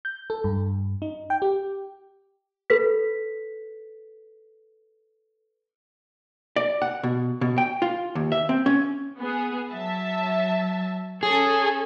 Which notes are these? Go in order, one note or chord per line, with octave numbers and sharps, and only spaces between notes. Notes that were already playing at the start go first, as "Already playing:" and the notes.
G6
A4
G2
D#4
G5
G4
A4 B4 B6
D5
F#5
B2
B2
G5
F4
D#2
E5
C4
C#4
B3 G#4
F#3 E5 A5
C#4 G#4 A4